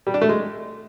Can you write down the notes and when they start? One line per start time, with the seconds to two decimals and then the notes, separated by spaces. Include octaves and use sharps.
0.07 G3
0.14 D4
0.22 A3
0.29 G#3